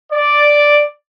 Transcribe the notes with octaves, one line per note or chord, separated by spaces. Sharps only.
D5